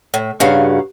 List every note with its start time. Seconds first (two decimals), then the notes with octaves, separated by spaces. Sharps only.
0.14 A2
0.40 G2 C#3 D#4 F#4 F5